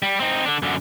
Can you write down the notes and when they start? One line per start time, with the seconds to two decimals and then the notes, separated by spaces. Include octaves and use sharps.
0.02 G3
0.20 C4 D#4
0.45 D3 D4
0.63 F#2 D3